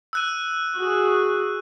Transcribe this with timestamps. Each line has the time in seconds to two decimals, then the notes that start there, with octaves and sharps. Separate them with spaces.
0.13 E6 F#6 D#7
0.76 F#4 G#4